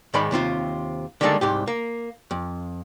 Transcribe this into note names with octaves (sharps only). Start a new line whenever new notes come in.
G#2 D#3 G#3 D5 B5
D#2 C3 C4 F4
D3 D#3 G3 G#3 A#3 A4
C2 G#2 G4
A#3
F2